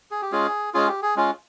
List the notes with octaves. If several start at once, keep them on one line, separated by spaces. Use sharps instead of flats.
G#4
G4
G#3 C#4 F4 G#4
G#3 C#4 F4 G#4
G4
G#4
G#3 C#4 F4